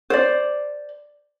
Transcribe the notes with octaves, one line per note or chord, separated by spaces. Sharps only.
C5 D5